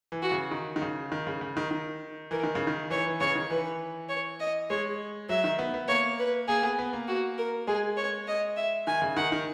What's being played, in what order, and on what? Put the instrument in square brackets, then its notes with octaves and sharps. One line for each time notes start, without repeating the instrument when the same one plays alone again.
[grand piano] E3
[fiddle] F#4
[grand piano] C#3
D#3
D#3
C#3
D#3
C#3
C#3
D#3
D#3
[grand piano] E3 [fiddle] A#4
[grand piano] D#3
C#3
D#3
[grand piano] E3 [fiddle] C#5
[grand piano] E3
[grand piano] C#3 [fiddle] C#5
[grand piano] D#3
[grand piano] E3 [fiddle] B4
[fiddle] C#5
D#5
[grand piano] G#3 [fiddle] C#5
[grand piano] F#3 [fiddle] E5
[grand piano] D#3
B3
B3
[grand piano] A#3 [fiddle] C#5
[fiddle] B4
[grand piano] A#3 [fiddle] G#4
[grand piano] B3
B3
A#3
[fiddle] F#4
A#4
[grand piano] G#3 [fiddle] G#4
[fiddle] C#5
D#5
E5
[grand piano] D#3 [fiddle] G#5
[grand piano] C#3
[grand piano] D#3 [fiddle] F#5
[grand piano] D#3